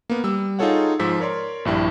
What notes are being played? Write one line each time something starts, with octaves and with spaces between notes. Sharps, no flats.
A#3 B3
G3 E6
D#4 F4 G#4 A4 C#5 F#5
G#2 F3 E6 B6
A#4 C#5 D5 C6
A#1 G2 E4 G5